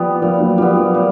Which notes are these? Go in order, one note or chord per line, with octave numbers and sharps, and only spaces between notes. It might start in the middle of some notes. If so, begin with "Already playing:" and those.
Already playing: F3 G3 B3
A#2 F3
F#3
F3 G3 B3
F3
A#2